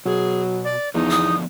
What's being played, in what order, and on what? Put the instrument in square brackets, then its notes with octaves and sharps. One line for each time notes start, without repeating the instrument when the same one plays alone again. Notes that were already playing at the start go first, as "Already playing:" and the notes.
[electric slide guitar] B2 [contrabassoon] F#3 [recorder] G#4
[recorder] D5
[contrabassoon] E2 [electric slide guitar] D3 F3 B3 [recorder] D#4
[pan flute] D#6